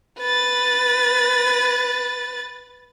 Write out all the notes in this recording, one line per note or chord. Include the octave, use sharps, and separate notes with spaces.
B4 A6